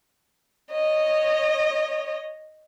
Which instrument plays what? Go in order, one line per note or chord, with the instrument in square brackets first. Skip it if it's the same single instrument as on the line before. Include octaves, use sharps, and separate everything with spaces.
[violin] C#5 D#5